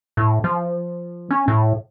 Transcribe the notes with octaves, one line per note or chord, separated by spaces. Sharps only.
A2
F3
C#4
A2